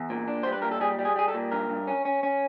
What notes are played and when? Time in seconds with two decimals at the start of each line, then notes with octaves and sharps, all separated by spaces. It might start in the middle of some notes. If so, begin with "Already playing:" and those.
Already playing: E2
0.10 A#2
0.28 D4
0.43 G3 C5
0.52 B4
0.62 A#2 A#4
0.71 A4
0.80 G3 G#4
0.99 G3
1.05 G#4
1.16 G3 G#4
1.28 A4
1.34 A#2
1.52 G2 A#4
1.69 G2
1.87 C#4
2.05 C#4
2.23 C#4